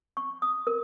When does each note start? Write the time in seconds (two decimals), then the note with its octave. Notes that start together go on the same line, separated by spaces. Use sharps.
0.17 C#6
0.42 D#6
0.67 A#4